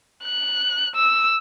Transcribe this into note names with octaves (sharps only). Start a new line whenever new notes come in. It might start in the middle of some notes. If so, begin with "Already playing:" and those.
F#6
E6